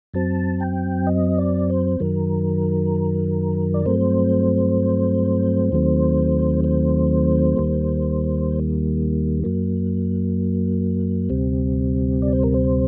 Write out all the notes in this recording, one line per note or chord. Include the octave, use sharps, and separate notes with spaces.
F#2 F#3 C4 A5
G5
D#5
D5
C5
F#2 D#3 F#3 A#4
D5
G2 F#3 A3 C4 C5
D#2 D#3 F#3 A3 C4
C5
D#2 D#3 G3 A#3
F#2 F#3 A#3
D2 C3 G3 C4
D5
C5
A#4
C5